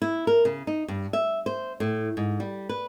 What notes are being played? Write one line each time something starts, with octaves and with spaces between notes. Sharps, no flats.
E4
A#4
C#3
D#4
G2
E5
C5
A2
G#2
G3
B4